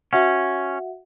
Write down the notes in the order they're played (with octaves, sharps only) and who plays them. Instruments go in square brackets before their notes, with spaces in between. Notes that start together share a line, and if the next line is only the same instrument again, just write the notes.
[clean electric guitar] C#4 [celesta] F#4 E5 F#5